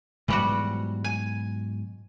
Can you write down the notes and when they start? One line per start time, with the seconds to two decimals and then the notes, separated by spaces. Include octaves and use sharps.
0.28 G#2 B2 E3 F#3 G3 F#4
1.04 G#5